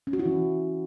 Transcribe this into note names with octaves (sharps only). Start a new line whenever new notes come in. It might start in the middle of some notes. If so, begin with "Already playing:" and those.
C#4
F#4
E4
E3